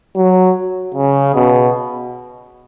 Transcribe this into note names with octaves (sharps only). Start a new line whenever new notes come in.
F#3
C#3
B2